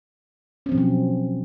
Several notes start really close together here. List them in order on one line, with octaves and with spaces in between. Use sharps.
C#4 C4 F3 B2 F#3